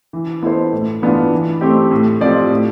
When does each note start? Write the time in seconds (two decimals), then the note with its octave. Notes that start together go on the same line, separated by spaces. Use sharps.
0.13 E3
0.43 B3 E4 A4 C5
0.72 A2
1.02 E3 B3 D4 F4
1.33 E3
1.61 A3 C4 G4
1.91 A2
2.21 F3 C4 G4 D5
2.51 A2